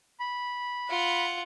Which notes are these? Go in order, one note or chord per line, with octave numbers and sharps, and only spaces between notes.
B5
F4 F#5